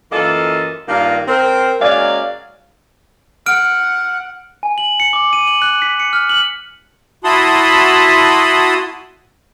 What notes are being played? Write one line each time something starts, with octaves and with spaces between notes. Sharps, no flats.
F#2 E3 A#3 F4 A4 D#5
G2 D#3 A#3 F4
C4 A#4
F#3 G#3 A#3 C#4 D5 F5
F#5 F6 D7
G#5
F#7
C#7
D6
D#7
F#7
F#6
B6
C#7
F6
F#7
E4 F#4 A5 B5 C6 D#6